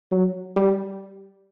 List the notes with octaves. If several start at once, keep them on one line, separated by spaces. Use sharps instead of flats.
F#3
G3